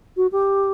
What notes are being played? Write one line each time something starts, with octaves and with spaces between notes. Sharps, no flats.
F#4
G4